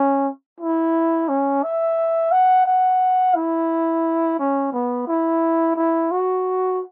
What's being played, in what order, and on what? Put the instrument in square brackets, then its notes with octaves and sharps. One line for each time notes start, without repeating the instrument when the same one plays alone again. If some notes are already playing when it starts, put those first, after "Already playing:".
Already playing: [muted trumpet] C#4
E4
C#4
E5
F#5
F#5
E4
C#4
B3
E4
E4
F#4